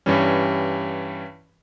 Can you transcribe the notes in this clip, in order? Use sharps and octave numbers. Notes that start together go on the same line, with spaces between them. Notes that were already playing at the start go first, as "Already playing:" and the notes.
G2 E3 G3 C#4